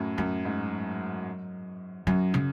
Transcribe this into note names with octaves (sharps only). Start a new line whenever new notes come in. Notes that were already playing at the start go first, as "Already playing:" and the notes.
Already playing: F#2 A2
F#2 F#3
G#2
F#2 F#3
C#3